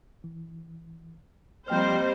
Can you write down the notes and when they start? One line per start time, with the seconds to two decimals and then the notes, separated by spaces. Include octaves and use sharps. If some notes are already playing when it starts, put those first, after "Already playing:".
0.24 E3
1.68 F3 G3 A#3 C4 C5 D#5 G5 F6